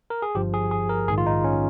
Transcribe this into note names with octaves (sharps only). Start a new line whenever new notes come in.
A#4
G#4
G1 G2 F3 G4
G#4
G#4
A#4
A#1 G#2 D#3 G#4
F4
D#4
C#4